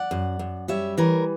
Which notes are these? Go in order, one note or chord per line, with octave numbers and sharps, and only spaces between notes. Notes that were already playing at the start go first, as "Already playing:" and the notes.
Already playing: D5 F#5
F#2
F#2
G3 C#5 E5
E3 A#4 C#5